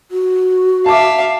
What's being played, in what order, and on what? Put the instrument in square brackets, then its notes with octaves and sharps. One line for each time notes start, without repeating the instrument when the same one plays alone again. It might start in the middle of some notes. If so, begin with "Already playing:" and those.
[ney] F#4
[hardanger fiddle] E5 F5 [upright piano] A5 D6